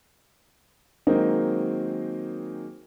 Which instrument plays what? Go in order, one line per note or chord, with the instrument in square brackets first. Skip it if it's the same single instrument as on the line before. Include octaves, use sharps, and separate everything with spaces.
[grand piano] D#3 F#3 G#3 A#3 C4 D#4